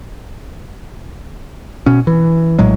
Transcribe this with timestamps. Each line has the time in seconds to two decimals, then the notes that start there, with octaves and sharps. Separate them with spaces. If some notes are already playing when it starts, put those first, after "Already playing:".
1.86 B2 C#4
2.07 E3
2.59 A#1 A2 F#3 G#3